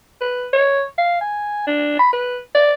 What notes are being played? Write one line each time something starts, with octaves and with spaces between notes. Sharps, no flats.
B4
C#5
F5
G#5
D4
B5
B4
D5